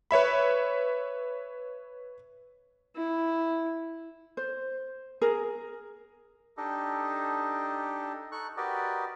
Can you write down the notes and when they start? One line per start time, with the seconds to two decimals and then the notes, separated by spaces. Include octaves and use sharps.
0.11 B4 C#5 E5 B5
2.96 E4
4.37 C5
5.22 G#4 A#4
6.57 D4 D#4 G4 A4 D#5
8.32 D#4 A4 C#6 F#6
8.57 F#4 G4 A#4 B4 D5 D#5